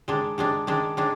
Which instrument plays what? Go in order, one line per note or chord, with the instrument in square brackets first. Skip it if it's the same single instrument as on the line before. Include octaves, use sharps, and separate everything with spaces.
[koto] D#3 G#3 D4
D#3 G#3 D4
D#3 G#3 D4
D#3 G#3 D4